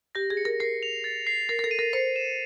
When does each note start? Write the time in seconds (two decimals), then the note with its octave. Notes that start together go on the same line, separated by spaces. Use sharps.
0.15 G4 A#6
0.30 G#4
0.37 C#7
0.45 A#4
0.60 A#4 C7
0.83 F7
1.04 A6
1.27 C7
1.49 A#4 C7
1.59 A#4
1.64 A4
1.71 D#7
1.79 A#4
1.93 C5 C#7
2.16 E7